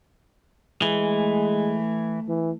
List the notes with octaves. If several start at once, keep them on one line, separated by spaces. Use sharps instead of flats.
E3 G#3 A3
E3